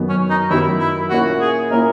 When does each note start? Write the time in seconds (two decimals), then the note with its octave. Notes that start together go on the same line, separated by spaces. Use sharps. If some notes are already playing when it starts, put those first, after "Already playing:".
Already playing: F#2 D#3 F#3 B3
0.09 C#4
0.30 D#4
0.50 F#2 D#3 F#3 B3 E4
0.80 E4
1.10 A#2 A#3 C#4 E4 F#4
1.41 G#4
1.71 A#2 A#3 C#4 E4 A#4